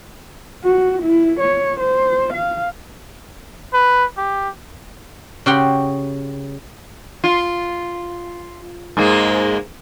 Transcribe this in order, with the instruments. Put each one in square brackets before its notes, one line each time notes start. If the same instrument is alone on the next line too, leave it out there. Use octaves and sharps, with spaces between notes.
[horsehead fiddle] F#4
E4
C#5
C5
F5
[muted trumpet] B4
G4
[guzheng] C#3 F#4 G4 F#5 G5 C6
[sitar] F4
G#2 G#3 A#3